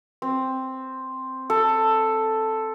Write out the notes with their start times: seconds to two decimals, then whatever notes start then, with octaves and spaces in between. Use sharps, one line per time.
0.22 C4
1.50 A4